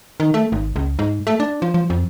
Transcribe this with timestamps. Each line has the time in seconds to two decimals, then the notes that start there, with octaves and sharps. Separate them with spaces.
0.20 D#3
0.34 A3
0.52 G#1
0.76 C#2
0.99 G#2
1.27 A3
1.40 D4
1.62 F3
1.74 F3
1.90 F2